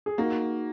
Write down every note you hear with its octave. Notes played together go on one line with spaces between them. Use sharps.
G#4
A#3 D#4 F#4